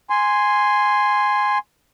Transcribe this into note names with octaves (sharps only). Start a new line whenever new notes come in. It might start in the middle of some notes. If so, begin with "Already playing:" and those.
G#5 C6